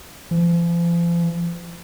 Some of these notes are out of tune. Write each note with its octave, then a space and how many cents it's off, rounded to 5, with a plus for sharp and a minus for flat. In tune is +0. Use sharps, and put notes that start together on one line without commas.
F3 -40